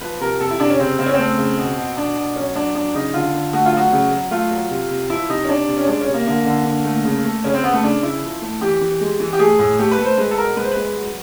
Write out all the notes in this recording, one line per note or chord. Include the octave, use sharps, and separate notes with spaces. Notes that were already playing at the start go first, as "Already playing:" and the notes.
F3 B4
C3 A#4
C3 A4
E4
C3 D4
C#4
C#3 C4
C#3 C4
C#4
A3 C4
C#3
B2
B2
B2 D4
B2
F#3 C#4
F#3 D4
F#3 D4
C#3 D#4
D3 F4
D3
A3 F#4
F4
F#3 F#4
C#3
F#3
A3 F4
F#3
C3
C3
F3 E4
C3 D#4
C#4
C3 D4
C3
C#4
G#3 D4
C#4
C3
A#3
D3 A#3
D3
D3
A3
C#3
A3
C#3 C#4
C4
C#3 B3
A3
C#3 D4
C#3 E4
F3
A3
E3 G4
E3
G#3
E3
G4
A3 G#4
A2
A3 G4
B4
A3
C5
G#3 B4
A4
B2 A#4
G#3 B4
C5
G#3 B4
F#3